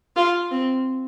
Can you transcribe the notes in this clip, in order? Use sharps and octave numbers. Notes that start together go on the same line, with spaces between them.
F4
C4